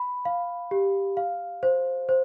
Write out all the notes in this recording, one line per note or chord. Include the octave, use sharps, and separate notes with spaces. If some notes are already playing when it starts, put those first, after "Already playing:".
Already playing: B5
F5
G4
F5
C5
C5